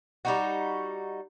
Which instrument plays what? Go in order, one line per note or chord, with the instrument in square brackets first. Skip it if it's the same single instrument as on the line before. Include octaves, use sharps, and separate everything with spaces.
[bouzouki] G3 D#4 F#4